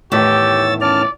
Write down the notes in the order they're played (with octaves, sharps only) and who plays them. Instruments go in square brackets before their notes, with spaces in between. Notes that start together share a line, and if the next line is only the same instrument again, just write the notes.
[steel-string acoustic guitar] E2 A2 D#3 [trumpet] G4 [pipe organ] C#5 E6 A6
[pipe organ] C#4 A5 F6 [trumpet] D5